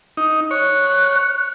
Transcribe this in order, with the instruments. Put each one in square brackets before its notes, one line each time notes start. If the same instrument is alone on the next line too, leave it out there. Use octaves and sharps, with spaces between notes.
[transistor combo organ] D#4
[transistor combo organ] C#5 [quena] F#6